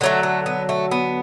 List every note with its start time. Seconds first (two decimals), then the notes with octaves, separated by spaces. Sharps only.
0.01 D3 F#3 A3 B3
0.23 A3
0.46 B3
0.69 A3
0.91 B3